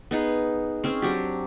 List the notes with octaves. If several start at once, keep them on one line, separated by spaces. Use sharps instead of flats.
B3 D#4 G#4 B5
C4 C#4 G#4
F#3 D4 G4